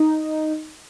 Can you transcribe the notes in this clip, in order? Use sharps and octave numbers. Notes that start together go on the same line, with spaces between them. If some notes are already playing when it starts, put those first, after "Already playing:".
Already playing: D#4